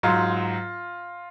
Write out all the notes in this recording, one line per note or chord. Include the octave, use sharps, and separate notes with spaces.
G#2 F#3 F4